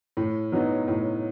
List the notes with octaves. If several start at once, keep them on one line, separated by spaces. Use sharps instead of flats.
A2
F#3 B3 D#4
A2